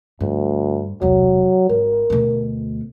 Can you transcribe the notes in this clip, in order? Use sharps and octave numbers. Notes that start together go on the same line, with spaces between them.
D2 G2
E1 C2 F#3
G#1 A#4
D2 B2